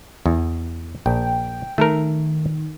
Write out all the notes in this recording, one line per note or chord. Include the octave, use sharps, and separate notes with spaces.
E2
A#1 G5
D#3 A3 A4 A#4